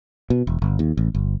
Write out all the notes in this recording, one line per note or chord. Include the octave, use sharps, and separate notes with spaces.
B2
E1
G1
D#2
A1
G1